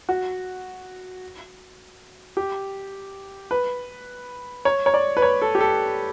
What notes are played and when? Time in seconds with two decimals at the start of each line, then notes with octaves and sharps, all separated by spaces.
0.09 F#4
2.37 G4
3.51 B4
4.65 C#5
4.86 C#5
4.94 D5
5.17 B4
5.22 C#5
5.42 A4
5.55 G4
5.61 A4